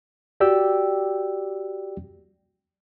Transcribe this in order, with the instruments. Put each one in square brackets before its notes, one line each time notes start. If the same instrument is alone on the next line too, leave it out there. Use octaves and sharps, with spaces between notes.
[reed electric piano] F#4 G4 D5 G5 E6